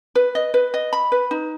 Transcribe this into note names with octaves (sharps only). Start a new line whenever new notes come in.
B4
D#5
B4
D#5
B5
B4
D#4